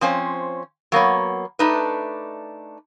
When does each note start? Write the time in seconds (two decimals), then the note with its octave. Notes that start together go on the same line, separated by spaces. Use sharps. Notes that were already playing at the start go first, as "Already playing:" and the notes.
0.01 F3 C4 C#4 C5
0.92 F#3 A#3 B3 C#5
1.59 A3 D4 D#4 B4